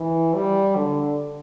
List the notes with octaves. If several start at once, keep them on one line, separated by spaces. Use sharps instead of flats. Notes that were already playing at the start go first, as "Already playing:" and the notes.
Already playing: E3
G3
D3